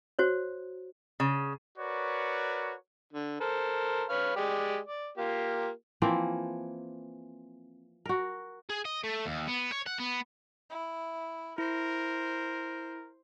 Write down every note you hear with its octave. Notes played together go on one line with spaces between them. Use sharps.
F#4 C5 C#5
C#3
F#4 A#4 B4 C#5 D5
D3
A4 A#4 C5
B4 C#5 F5
G#3 G4 D5
D5
A#3 F4 G4
E3 F3 A#3 C4
F#4 A#4
G#4
D#5
A3
D#2
B3
C#5
F#5
B3
E4
E4 A#4 C5